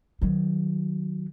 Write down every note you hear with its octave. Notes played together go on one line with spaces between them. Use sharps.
D#3 F#3